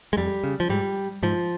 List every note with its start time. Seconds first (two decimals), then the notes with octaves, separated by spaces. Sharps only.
0.13 G#3
0.17 F2 G3
0.44 C#3
0.60 F3
0.69 G#2 G3
1.23 G#2 F3